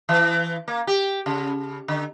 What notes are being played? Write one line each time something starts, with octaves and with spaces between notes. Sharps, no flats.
E3
A#3
G4
C#3
D3